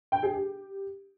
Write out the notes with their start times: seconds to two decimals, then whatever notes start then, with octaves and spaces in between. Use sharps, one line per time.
0.12 G5
0.23 G#4
0.34 G4